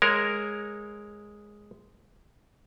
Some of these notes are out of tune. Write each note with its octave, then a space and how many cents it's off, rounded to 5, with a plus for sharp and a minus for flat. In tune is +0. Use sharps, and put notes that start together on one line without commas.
G#3 +0 A#4 +0 C#5 -15